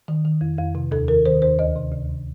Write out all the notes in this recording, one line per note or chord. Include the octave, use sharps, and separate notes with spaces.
D#3
D#3
F2
F2
C3
D#2 A4
D#3 A#4
D#3 C5
D#2 C5
D2 D#5
C3
D2
C3